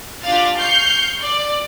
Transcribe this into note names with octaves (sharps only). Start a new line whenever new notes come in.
D4 F4 G4 D5 F5 A6
C#6 F6 G6 C7
D5